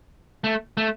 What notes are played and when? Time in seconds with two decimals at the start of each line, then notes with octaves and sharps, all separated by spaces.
0.44 A3
0.77 A3